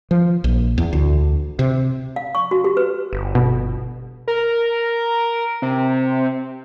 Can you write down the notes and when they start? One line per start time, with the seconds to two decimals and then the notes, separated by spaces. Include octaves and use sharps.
0.11 F3
0.44 A#1
0.78 E2
0.93 D2
1.59 C3
2.16 F5
2.35 C#6
2.51 F#4
2.64 G4
2.77 B4
3.13 G1
3.35 B2
4.28 A#4
5.62 C3